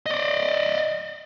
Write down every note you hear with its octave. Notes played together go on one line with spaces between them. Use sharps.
D5 D#5